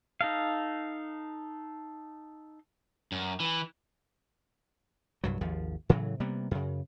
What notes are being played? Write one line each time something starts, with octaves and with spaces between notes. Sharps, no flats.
D#4 A4 F5
F#2
E3
C2 G2 F#3
G#1 D#2 F3
A2 C#3 E3 F#3
C3 G3 A#3 B3
F#2 C#3